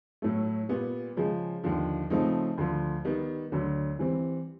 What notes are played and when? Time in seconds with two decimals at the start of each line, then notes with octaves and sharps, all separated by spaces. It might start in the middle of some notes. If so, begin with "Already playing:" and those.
0.22 A2 F#3 A3
0.69 A#2 G3 B3
1.17 C#3 F3 G#3
1.64 D#2 D3 F3
2.10 C#3 F3 A3 C4 D#4
2.58 D2 D3 F3
3.05 D#3 G3 B3
3.52 D2 D3 F#3
3.99 E3 G3 C4